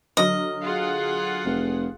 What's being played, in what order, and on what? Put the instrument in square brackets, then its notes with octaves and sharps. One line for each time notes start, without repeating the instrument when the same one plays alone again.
[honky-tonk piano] D3 F#3 F6 [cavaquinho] D#5
[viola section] F4 G#4 F#5
[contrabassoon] F1